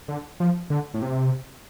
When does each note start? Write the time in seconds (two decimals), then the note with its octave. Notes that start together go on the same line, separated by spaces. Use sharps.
0.08 D3
0.40 F3
0.70 D3
0.94 A2
1.02 C3